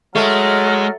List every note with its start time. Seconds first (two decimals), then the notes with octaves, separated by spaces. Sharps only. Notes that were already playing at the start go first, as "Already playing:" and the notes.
0.16 F#3 G#3 A3 D#5 F6